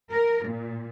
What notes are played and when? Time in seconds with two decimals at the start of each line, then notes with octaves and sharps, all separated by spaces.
0.10 A#4
0.46 A#2